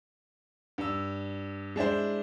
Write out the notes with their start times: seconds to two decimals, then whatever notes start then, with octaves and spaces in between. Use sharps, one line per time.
0.78 G2 E6
1.76 G#3 D4 E4 C5